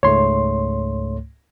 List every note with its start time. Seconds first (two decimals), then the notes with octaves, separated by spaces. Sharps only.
0.03 C#2 G#2 A3 C#5 C6